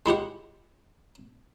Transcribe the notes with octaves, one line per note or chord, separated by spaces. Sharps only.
G#3 E4 G4 F#5